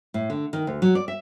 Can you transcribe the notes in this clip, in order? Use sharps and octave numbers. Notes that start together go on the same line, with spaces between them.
A2
D3
D#3
D2
F#3
D5
E5